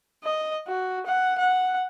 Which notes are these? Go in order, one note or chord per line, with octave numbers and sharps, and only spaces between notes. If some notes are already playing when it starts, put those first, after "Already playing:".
D#5
F#4
F#5
F#5